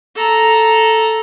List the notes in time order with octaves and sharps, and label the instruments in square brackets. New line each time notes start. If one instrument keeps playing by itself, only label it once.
[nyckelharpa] A4 A#5